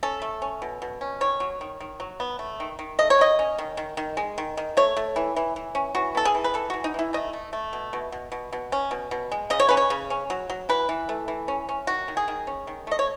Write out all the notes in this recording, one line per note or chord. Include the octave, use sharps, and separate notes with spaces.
C#4 A4
A3
C#4
B2
B2
C#4
D#3 C#5
F#3
D#3
D#3
F#3
B3
A3
D#3
D#3
A3 D#5
C#5
D#3 D#5
C#4
D#3
D#3
D#3
G#3
D#3
D#3
A3 C#5
A3
E3
E3
E3
C#4
E3 F#4
B3 A4
G#4
E3
B4
E3 A4
E3 F#4
D#4
E3 E4
A3 D#5
A3
A3
B2
B2
B2
B2
B2
C#4
B2
B2
G#3
C#3 D#5
C#5
C#4 B4
C#5
C#3
C#4
F#3
F#3
E3 B4
E3
A3
E3
C#4
C#4
D#3 F#4
D#3
G#4
D#3
C#4
D#3
A3 D#5
C#5